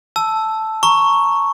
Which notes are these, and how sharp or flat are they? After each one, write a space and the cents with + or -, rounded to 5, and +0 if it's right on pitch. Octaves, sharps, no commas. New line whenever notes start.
A5 +0 E6 +0
A#5 +0 C#6 +0